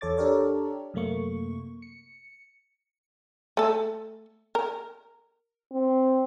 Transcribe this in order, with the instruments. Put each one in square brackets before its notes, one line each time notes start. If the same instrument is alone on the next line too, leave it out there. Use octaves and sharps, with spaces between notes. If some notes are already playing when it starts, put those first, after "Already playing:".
[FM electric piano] E2 A4 C#5 D6 A6
D4 G4 A4 A#4 C#5 D5
F#2 C3 A3 A#3 C#6
C#7
[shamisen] A3 A4
A#4
[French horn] C4